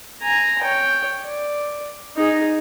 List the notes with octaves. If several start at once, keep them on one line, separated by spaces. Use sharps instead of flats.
G#5 A#5
C#5 G5
D5
D#4 G#4